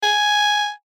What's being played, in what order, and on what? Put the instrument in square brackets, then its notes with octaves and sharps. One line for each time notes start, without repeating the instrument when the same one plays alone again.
[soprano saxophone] G#5